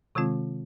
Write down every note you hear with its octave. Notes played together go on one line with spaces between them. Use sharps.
C3 D#3 G#3 C4 F4